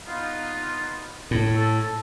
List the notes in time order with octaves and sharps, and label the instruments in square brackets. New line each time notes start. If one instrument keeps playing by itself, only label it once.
[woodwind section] B3 D#4 F4
[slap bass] A2
[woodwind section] A4